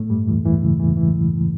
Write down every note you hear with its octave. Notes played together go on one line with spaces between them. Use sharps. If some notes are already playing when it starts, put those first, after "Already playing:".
Already playing: A2 A3
G2 G3
E2 E3
E2 E3
C#3
E2 E3
E3